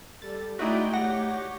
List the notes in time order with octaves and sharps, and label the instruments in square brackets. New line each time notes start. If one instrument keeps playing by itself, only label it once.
[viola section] G3 A4 [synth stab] A6
[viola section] G#3 D5 G5 [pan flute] A3 [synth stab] D#4 E4 F#4
[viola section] G4 C#5 [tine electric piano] F#5 [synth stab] A#6